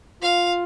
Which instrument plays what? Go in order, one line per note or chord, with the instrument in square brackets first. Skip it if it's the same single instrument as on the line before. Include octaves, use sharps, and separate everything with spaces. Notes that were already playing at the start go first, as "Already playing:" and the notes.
[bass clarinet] F4 [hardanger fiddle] F5